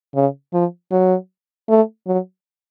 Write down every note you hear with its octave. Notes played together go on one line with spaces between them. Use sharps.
C#3
F3
F#3
A3
F#3